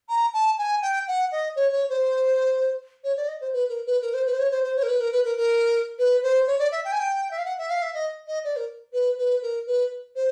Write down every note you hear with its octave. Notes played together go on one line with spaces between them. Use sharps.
A#5
A5
G#5
G5
F#5
D#5
C#5
C#5
C5
C#5
D5
D#5
C5
B4
A#4
B4
A#4
C5
B4
C5
C#5
C5
C5
C#5
A#4
B4
A#4
B4
A#4
A#4
B4
C5
C#5
D5
E5
G5
G#5
G5
E5
F5
F#5
E5
F5
E5
D#5
D#5
D5
A#4
B4
B4
A#4
B4
C5